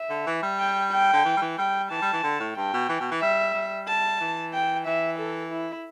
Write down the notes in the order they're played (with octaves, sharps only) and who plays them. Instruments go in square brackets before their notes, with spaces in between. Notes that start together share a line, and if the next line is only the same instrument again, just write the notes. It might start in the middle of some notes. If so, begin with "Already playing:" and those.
Already playing: [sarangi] E5
[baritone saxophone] D3
E3
G3
[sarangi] G5
G5
[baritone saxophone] D3
E3
G3
E3
[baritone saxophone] G3 [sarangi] G5
[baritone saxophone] E3 [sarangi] A5
[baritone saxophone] G3
E3
D3
A2
[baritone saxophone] G2 [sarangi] G5
[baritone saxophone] B2
E3
B2
E3
[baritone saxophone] G3 [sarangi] E5
[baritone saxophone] G3
[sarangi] A5
[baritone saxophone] E3
[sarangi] G5
[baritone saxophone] E3 [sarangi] E5
[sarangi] A4
E4